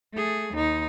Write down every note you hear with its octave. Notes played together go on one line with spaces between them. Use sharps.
A3 G#4
D#2 D#4